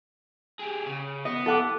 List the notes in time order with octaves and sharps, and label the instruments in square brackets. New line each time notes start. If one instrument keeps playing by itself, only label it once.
[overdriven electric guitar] G4 G#4
C#3
[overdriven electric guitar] B3 [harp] D#5
[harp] A4 F#5 D6